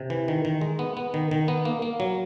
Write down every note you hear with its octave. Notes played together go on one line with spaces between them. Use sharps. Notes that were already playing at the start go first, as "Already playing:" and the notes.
Already playing: C3
E3
D#3
D#3
G#3
B3
B3
D#3
D#3
B3
A#3
A#3
F#3